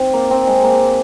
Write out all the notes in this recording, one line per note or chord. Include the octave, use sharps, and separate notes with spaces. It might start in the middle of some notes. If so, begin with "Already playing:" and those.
Already playing: C4 D#4
A#3
C4
G#3
A#3